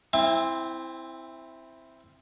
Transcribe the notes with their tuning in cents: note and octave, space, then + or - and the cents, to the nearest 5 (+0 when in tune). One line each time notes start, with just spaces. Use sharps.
C4 +0 E4 +0 G5 +45